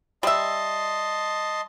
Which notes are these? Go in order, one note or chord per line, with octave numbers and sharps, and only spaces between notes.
G3 D#5 E5 A5 C6